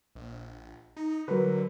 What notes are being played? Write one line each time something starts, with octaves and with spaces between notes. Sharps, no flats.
A#1
D#4
D3 F#3 A#4 B4